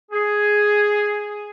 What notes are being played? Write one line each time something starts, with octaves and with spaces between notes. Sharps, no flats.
G#4